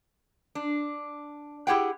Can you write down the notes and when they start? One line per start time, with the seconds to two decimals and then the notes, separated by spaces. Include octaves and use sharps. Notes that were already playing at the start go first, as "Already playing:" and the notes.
0.55 D4
1.67 E4 G4 G#4 F#5 G5